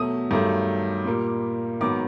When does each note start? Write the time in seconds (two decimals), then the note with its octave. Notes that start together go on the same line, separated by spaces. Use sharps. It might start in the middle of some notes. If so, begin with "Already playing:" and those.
Already playing: B2 F#3 A3 D#6
0.31 G2 D#3 F#3 A3
1.05 A#2 G3 A#3
1.80 G#2 D#3 F#3 B3 D6